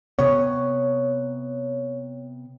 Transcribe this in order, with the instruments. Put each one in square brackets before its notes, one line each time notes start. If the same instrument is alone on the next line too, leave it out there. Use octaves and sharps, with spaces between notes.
[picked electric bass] C3 B3 [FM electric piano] C#5